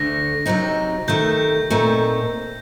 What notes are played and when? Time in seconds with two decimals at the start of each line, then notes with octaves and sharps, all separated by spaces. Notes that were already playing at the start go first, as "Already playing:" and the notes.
Already playing: D2 D3 A3 A#6
0.46 C3 F#3 C4 D#4
1.08 C3 D#3 A3 G6
1.70 A#2 A3 C4 D#4